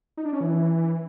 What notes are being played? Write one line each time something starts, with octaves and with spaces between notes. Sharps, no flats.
D#4
D4
C#4
E3